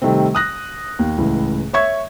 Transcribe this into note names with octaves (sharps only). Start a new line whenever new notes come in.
C3 D#3 G3 A3 C4
D#6 F#6 A#6
D#2
C#2 A2 E3
C#5 E5 C#6 G#6